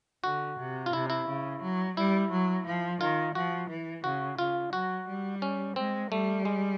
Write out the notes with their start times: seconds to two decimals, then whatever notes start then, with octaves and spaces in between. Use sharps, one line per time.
0.24 D3 F#4
0.59 C3
0.86 F4
0.93 C3 E4
1.10 E4
1.27 C#3
1.62 F#3
1.97 G3 E4
2.31 F#3
2.66 F3
3.01 D#3 F4
3.35 F3 F#4
3.69 E3
4.04 C#3 F#4
4.38 C#3 F4
4.73 F#3 F#4
5.08 G3
5.42 C#4
5.76 G#3 C4
6.12 G3 A3
6.45 G#3